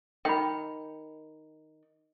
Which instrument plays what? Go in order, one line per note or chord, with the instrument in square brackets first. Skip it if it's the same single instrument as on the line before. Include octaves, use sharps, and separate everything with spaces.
[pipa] D#3 [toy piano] G5 B5